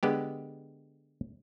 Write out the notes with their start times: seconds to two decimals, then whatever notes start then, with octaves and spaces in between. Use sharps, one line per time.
0.03 D3 G#3 B3 G4